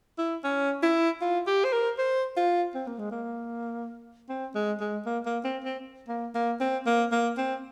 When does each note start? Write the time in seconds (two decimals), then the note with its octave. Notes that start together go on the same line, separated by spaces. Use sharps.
0.18 E4
0.44 C#4
0.83 E4
1.21 F4
1.47 G4
1.65 C5
1.73 A#4
1.98 C5
2.36 F4
2.75 C4
2.87 A#3
2.99 G#3
3.11 A#3
4.29 C4
4.55 G#3
4.80 G#3
5.06 A#3
5.26 A#3
5.44 C4
5.64 C4
6.08 A#3
6.35 A#3
6.60 C4
6.86 A#3
7.12 A#3
7.37 C4